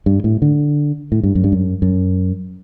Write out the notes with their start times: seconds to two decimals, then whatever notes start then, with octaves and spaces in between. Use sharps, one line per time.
0.06 G2
0.24 A2
0.42 D3
1.12 A2
1.23 G2
1.35 F#2
1.44 G2
1.52 F#2
1.82 F#2